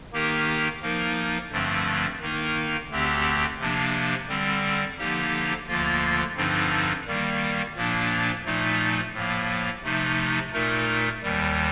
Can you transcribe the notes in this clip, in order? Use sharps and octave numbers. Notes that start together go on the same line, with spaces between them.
D#3 A#3 D#4 G4 A#4
F3 A#3 D#4 A#4
G2 D3 F3 A3 C4
D#3 A#3 D#4 A#4
D2 D3 A3 C4 G4
C3 F3 A#3 D4
D3 G3 C4
D3 F3 A#3 D#4 G4
D2 D3 F3 A#3 F4
G2 D3 F3 C4 D#4
D#3 G3 A#3
A#2 F3 A#3 D4
A#2 F3 A3 D#4
A2 F3 A#3
C3 F3 A3 D#4
A#2 A3 D#4 A#4
D#2 D#3 G3